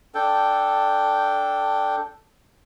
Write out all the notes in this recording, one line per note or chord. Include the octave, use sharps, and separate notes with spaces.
D4 A4 G5